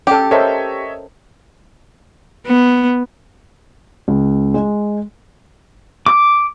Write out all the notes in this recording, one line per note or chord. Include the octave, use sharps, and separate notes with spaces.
C#4 G4 A4
A4 A#4 C5 C#5 D#5 E5
B3
C#2
G#3
D6